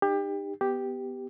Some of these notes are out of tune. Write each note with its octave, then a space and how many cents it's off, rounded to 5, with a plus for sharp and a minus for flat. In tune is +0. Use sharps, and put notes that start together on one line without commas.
D#4 -40 G4 +25
B3 +5 G4 +0